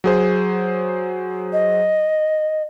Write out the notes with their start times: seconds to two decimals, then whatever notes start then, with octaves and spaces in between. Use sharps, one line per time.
0.04 F#3 G#4 C5
1.53 D#5